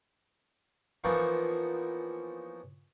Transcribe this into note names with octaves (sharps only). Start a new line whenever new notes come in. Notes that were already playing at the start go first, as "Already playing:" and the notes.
E3 F3 A#3 B3 C#4 D#4